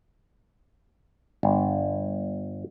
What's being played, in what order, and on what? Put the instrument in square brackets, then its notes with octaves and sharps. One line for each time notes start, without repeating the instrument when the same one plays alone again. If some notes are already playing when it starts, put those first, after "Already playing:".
[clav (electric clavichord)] G1